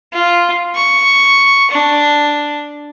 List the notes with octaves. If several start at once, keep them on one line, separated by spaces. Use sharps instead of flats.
F4
C#6
D4